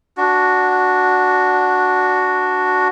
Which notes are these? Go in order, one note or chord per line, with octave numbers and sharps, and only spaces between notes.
D4 F#4